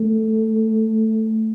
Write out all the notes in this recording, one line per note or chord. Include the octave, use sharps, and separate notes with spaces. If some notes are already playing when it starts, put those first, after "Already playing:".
Already playing: A3